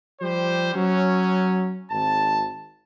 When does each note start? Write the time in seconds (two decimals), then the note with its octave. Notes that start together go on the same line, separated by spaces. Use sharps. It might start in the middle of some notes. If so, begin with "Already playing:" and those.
0.21 F3 G3 G4 C5
0.75 F#3 C#4
1.91 G#1 A5